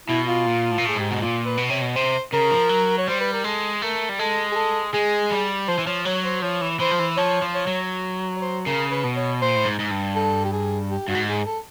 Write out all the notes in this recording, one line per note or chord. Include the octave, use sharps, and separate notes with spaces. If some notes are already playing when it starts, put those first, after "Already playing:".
B2 E4
F4
A#2
A2
A#2
A2 G#4
G#2 G4
B2 F#4
A#2 F4
B4
B2
C3 C#5
B2
C3 C5
C#3 A#4
F3
F#3
C#5
G3 C5
B4
A#4
G#3 A4
A3 A#4
G3
G#3 A4
G#4
A4
G#3 G#4
G3
F3 C5
E3
F3 C#5
F#3 C#5
C5
F3 C#5
E3
E3 C5
F3
E3
F3 C#5
F3
C#5
F#3
C#5
C5
C#3 A#4
B4
B2
C#5
A#2 C5
A2
G#2
G#2
G2
A4
G4
G#4
G4
G2 F#4
G#2
G#4
A4